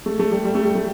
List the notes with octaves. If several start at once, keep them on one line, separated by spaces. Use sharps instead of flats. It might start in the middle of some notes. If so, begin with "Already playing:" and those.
A3
A3
G3
G3
A3
G3
A3